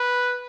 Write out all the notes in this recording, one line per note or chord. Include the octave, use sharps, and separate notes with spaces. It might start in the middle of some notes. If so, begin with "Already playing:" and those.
Already playing: B4